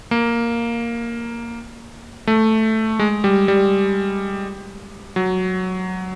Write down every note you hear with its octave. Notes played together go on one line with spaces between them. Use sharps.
A#3
A3
G#3
G3
G3
F#3